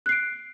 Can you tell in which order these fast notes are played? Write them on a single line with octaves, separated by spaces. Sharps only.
F#6 C7 D7